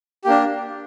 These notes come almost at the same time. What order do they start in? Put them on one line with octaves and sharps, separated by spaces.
G4 A#3 D4